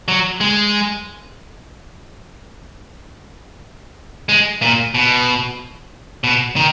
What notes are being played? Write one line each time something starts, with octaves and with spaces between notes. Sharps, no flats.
F#3
G#3
G#3
A#2
B2
B2
D#3